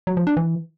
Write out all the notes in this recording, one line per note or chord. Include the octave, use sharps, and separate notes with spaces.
F#3
F3
D4
E3